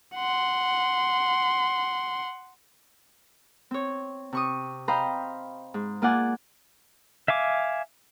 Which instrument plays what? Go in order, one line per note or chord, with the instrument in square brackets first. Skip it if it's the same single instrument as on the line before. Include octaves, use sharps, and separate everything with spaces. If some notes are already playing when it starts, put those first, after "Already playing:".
[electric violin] F#5 C6
[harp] C4 C#5
C3 C#6 D#6
C5 D#5 F5 G5 A#5 B5
G#2
A#3 F4 D5 F#5 G#5
[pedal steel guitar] E5 F5 G#5 D6